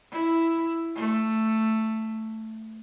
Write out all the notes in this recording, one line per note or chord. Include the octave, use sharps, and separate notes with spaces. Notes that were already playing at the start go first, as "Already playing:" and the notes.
E4
A3